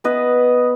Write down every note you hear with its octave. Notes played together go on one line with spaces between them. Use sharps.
B3 B4 D#5